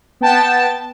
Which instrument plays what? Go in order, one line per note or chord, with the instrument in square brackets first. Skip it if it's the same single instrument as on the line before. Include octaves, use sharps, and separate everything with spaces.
[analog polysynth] B3 G5 A5